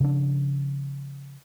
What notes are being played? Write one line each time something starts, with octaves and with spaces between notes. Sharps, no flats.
C#3 F3 D4